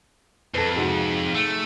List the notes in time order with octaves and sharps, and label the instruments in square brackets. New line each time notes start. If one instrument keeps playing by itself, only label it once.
[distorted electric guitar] F2 [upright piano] A4 B4
[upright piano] G#2 C3 F#4
[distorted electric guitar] A3